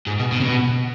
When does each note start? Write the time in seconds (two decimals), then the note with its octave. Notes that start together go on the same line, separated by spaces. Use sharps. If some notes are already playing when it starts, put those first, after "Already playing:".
0.07 G#2
0.19 B2
0.32 B2
0.41 C#3
0.44 B2